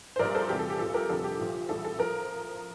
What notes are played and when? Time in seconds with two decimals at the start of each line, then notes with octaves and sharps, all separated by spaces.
0.16 C5
0.19 A#1 A#2 G3 A#4 D5
0.35 A4 C5
0.49 E2 C3 G3 G4
0.59 A4
0.70 G4
0.79 A#1 A#2 G3 A4
0.94 G4 A#4
1.09 F1 F2 D3 G3 A4
1.24 G4
1.40 A#1 A#2 F3
1.69 A1 A2 G3 A4
1.85 A4
1.99 F3 A#4